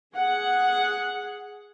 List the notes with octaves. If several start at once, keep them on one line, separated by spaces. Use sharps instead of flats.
G#4 F#5